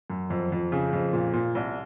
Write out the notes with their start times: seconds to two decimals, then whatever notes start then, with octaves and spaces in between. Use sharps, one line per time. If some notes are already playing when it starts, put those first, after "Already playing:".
0.10 F#2
0.30 F2
0.52 F2
0.72 C#3
0.93 F2
1.13 A#2
1.33 A#2
1.55 C2